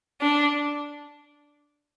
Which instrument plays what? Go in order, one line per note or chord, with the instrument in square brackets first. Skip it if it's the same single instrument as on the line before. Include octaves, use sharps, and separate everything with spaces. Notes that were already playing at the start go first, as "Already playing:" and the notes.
[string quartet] D4